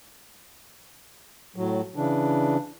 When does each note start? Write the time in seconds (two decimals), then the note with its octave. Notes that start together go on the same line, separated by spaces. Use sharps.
1.56 A2 F#3
1.96 C#3 E3 D4